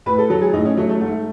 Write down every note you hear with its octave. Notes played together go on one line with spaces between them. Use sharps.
A2 B4
A4
F#3 A4
G#4
A2 D#4
C#4
F#3 A3
A3
G#2 A3